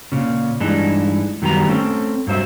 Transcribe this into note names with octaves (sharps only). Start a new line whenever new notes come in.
A#2 C#3
G2 E3 G#3 D4 D#4
F#2 D#3 G3 B3 A#5
A3 C4 C#4 A4
G2 F#3 C5 E5